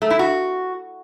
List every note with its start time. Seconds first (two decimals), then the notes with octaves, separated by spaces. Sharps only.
0.02 A3
0.10 E4
0.19 F#4